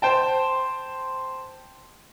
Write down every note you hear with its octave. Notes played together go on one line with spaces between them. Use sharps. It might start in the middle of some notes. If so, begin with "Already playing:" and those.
C5 G5 A5